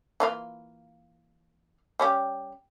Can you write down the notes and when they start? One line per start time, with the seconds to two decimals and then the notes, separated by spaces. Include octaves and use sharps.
0.20 E3 A#3 F4
2.00 G3 C#4 G4